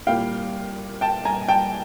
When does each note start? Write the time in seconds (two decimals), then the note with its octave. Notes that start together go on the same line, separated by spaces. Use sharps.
0.07 C2 A#2 G3 A#3 F5 G5
1.01 G5 A5
1.25 G#5 A#5
1.48 G5 A5